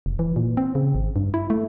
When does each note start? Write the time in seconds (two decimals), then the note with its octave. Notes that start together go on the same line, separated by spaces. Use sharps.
0.06 F1
0.19 E3
0.36 A#2
0.57 C4
0.75 C#3
0.95 G#1
1.16 G2
1.34 E4
1.50 A3